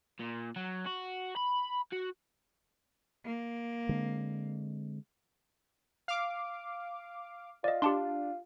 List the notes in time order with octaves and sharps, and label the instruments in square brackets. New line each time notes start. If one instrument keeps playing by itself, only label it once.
[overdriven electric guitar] A#2
F#3
F#4
B5
F#4
[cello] A#3
[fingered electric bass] D3 G#3 C4
[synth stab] F5 D6
[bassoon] F4 [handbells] D5 D#5
[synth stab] D4 [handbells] G4 A5 C6